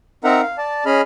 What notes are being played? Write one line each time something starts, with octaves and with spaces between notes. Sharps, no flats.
C4 D#4 A#4 E5 F#5 A#5
F5
D5 A5
C#4 G#4 D#5 B5 F6